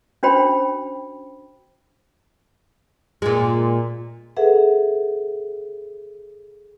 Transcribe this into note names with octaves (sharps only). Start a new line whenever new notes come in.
C#4 D4 F#4 C5 G5 B5
A#2 G#3
G#4 A4 B4 E5 F#5